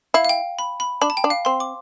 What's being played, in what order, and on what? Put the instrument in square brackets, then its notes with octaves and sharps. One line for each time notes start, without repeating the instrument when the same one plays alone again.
[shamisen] E4 [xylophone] F5
[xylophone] F5
G5
B5
B5
[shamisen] D4 [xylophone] B5
[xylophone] A5
G5
[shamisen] D4
[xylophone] F5
[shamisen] C4 [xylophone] C6
[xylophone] D6